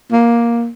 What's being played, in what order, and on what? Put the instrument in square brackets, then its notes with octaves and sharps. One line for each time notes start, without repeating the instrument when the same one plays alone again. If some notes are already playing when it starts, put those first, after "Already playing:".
[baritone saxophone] A#3